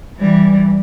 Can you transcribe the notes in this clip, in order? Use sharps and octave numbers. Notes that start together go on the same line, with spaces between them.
E3 G3